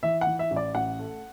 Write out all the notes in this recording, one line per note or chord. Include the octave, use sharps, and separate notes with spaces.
E3 E5
F#5
E3
E5
A1
D5
A1 F#5
A3